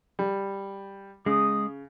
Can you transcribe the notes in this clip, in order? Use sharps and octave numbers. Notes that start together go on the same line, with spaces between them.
G3
C#3 G#3 D#6